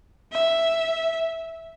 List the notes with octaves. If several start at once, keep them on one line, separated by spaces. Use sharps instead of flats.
E5